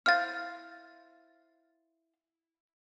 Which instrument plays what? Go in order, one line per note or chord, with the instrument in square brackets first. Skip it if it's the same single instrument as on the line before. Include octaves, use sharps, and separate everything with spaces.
[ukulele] E4 C5 F5 [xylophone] F6 A6